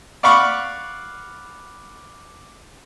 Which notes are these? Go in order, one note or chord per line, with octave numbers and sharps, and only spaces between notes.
D5 F5 F#5 B5 C#6 D6